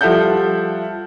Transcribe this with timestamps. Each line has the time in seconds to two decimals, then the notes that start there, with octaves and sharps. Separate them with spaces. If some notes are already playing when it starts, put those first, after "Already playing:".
0.01 F3 G3 A4 E5 F#5 G6